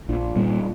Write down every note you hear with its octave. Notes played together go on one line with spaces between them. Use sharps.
A#1 D4 F4
A#2 G3